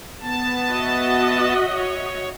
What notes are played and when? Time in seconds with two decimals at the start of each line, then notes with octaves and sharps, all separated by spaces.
0.21 B3 A5
0.69 F#4 D#5 E5
1.66 C#5